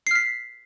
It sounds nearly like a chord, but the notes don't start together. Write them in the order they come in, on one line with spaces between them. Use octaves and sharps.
C7 F6 B6